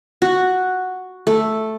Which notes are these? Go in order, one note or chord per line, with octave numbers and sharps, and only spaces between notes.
F#4
A3